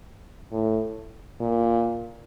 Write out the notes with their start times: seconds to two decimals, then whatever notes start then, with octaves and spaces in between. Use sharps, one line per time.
0.52 A2
1.40 A#2